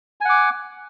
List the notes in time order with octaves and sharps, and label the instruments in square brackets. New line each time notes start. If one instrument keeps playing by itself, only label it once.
[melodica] G#5
F#5
D6